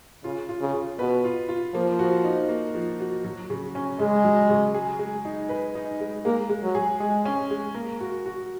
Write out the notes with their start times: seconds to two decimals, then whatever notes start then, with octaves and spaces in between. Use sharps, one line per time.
0.24 C#3 F4
0.49 F4
0.61 C#3
0.74 F4
0.99 B2 B4
1.24 F4
1.49 F4
1.74 F3 A#3
1.99 F#4
2.24 D#4
2.49 A#3
2.75 F3
3.00 F#4
3.24 F#3
3.50 C#3
3.75 C#4
3.99 C#3 G#3
4.24 F#3
4.50 C#3
4.74 G#4
4.99 G#3
5.25 D#4
5.49 B4
5.75 D#4
6.00 G#3
6.25 G#3 A#3
6.49 G#3
6.63 F#3
6.75 G#4
7.00 G#3 G#4
7.25 C#4
7.51 G#3
7.75 A#3 A#4
8.00 F#4
8.26 F#4